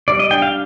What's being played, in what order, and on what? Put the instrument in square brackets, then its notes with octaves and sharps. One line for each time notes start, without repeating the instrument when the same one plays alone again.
[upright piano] G3 [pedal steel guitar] D5
[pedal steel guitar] D#5
[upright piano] D4 [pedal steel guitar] G5
[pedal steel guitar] F5